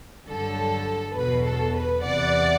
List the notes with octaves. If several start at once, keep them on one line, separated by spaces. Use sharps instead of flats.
G2 D3 F#3 A4
E2 B2 F#3 B4
A4
B4
E2 C3 E3 D5 F#5